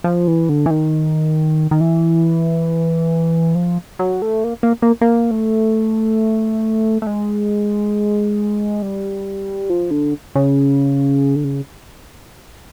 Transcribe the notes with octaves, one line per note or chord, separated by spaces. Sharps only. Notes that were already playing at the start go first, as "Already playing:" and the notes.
F3
E3
D3
E3
D#3
D#3
E3
F3
F#3
A3
A#3
A#3
A#3
A#3
A3
A3
G#3
G3
F3
D3
C#3
D3
C#3